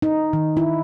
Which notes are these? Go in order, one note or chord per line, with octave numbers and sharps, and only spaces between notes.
D#4
D#3
E4